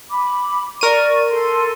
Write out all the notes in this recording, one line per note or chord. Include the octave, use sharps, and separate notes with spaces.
B5 D6
A#4 D5 C#6 D#7
A4 C6